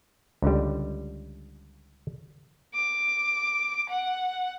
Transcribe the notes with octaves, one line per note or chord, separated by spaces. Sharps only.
C#2 D3 G3
D6
F#5